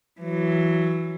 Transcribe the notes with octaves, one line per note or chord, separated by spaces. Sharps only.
E3 F#3